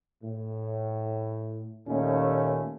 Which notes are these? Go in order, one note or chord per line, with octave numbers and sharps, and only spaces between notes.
A2
D#2 A#2 A3 C#4